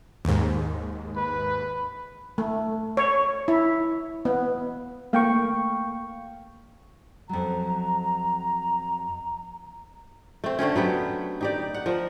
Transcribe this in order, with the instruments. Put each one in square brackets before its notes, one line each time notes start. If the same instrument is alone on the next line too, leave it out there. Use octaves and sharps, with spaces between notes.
[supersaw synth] D#2 G#2
[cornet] B4
[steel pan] A3
C#5
E4
B3
[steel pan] A3 A#3 [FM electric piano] F5 G5 C#6
[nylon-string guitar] F2 F#3 [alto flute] A#5
[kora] A3 C4
D3 A3 C4 C#4
F#3 B3 G4
D#4 G4 D5
F#5
F3 A#4